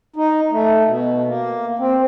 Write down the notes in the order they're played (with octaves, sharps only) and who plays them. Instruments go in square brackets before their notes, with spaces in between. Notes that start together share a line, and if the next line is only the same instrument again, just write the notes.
[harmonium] D#4
A3
B2
A#3
C4